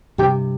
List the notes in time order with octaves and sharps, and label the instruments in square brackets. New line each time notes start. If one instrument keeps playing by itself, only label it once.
[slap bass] G2 C3 [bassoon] G4